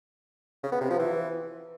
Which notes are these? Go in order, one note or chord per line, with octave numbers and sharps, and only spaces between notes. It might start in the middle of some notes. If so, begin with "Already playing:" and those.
C#3
B3
C3
F3
E3